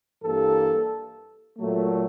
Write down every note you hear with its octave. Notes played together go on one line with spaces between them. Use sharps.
G2 E3 G3 A#3 A4
A#2 F#3 A3